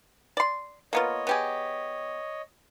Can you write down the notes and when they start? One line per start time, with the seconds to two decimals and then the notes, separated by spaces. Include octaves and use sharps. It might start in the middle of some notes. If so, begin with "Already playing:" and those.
0.37 D5 C6
0.93 A#3 B3 F4 C#5 D#5
1.27 B3 G4 G#4